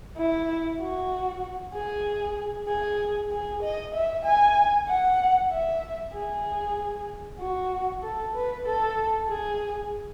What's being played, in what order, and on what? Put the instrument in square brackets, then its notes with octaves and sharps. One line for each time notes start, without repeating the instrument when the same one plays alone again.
[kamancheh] E4
F#4
G#4
G#4
G#4
D#5
E5
G#5
F#5
E5
G#4
F#4
A4
B4
A4
G#4